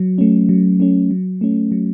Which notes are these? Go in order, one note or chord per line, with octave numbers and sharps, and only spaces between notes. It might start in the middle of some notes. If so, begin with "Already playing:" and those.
Already playing: F#3
A3 C#4
F#3
A3 C#4
F#3
A3 C#4
F#3